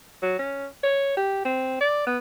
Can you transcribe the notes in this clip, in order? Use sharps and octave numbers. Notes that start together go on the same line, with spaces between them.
F#3
C#4
C#5
G4
C4
D5
B3